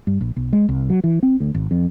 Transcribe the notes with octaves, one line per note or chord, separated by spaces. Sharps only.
G2
A#1
B1
G#3
C2
F#3
E3
C4
D2
G#1
F2